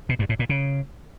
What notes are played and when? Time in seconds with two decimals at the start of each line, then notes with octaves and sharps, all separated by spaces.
0.09 B2
0.19 G2
0.29 A2
0.39 A#2
0.49 C#3